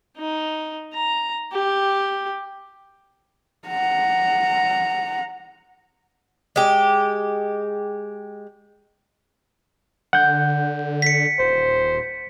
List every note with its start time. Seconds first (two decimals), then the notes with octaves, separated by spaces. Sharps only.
0.18 D#4
0.93 A#5
1.52 G4
3.68 F#5 A#5
6.56 G#3 G4
10.13 D3 F#5 G6
11.02 B6 C#7
11.39 D#1 C5